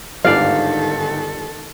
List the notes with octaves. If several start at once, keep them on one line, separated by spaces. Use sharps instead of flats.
G1 D2 G#2 D#3 A4 D5 F5